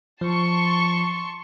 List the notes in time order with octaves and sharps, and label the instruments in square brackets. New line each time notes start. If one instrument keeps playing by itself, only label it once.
[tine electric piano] F3 [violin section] A5 C6 C#6